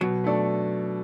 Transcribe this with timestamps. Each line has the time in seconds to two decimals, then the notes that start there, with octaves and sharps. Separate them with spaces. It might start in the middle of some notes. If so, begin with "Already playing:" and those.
0.01 B2 F#3
0.24 A3 D4 A4 D5